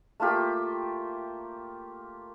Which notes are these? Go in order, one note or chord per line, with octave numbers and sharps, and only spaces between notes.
A3 A#3 F4 G4